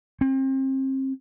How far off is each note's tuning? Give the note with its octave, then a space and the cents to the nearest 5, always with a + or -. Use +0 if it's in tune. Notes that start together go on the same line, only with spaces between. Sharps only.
C4 +35